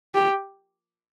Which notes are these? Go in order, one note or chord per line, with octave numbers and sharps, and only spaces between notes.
G4